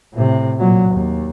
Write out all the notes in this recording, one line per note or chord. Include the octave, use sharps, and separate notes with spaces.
A2 C3
A#2 F#3
D#2